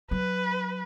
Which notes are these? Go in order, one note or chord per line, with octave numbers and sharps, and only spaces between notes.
F#3 B4